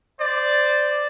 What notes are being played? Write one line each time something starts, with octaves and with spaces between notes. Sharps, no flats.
C5 D5